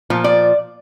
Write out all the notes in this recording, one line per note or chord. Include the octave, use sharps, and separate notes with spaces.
A#2 F3
D5